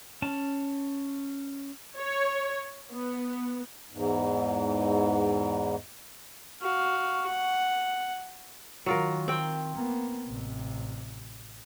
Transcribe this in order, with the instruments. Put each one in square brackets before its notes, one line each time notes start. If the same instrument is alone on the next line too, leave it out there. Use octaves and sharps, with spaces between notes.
[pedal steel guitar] C#4 A5
[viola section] C#5
B3
[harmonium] E2 G#2
[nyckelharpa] F#4 F5
F#5
[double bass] D#3 [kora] F#3 F4 A#4
[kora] C4 G5
[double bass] A#3 B3
A1 C3